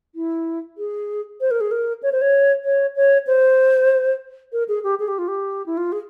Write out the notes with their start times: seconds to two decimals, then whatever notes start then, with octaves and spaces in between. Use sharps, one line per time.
0.15 E4
0.78 G#4
1.41 C5
1.51 A#4
1.61 G#4
1.71 A#4
2.03 C#5
2.12 C5
2.21 C#5
2.65 C#5
2.96 C#5
3.27 C5
4.53 A#4
4.68 G#4
4.84 G4
5.00 G#4
5.08 G4
5.18 F4
5.28 G4
5.66 E4
5.77 F4
5.92 G#4